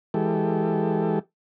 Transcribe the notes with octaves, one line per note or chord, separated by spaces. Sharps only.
E3 G#3 G4 A4